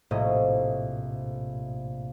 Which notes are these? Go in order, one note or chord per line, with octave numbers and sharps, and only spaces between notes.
A#1 A2 C3 D#5